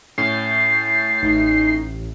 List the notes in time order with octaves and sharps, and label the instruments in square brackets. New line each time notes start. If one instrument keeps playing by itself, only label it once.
[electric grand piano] A2 C#4 [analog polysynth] G6 A6 [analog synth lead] C7
[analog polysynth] A1 [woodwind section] D#4